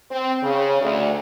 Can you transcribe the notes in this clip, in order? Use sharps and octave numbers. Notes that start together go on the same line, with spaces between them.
C4
C#3
D2